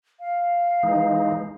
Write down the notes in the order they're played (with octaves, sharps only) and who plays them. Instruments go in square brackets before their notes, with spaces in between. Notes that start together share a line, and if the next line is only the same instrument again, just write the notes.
[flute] F5
[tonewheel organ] E3 G#3 D#4